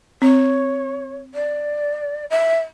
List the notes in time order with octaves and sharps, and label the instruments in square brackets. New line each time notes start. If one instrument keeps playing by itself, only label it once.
[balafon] C4 [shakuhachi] C#5
[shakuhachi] D5
E5